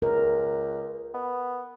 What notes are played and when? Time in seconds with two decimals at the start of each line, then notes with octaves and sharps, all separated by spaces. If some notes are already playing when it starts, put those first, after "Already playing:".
0.02 C#2 A#4
1.14 B3